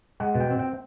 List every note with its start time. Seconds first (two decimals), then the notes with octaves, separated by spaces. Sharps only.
0.20 G#3 F#5
0.35 B2
0.40 G5
0.50 C4
0.59 G5